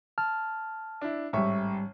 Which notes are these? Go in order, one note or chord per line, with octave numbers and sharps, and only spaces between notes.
A5 F6
D4 E4
A1 G#2 G3 E5 C#6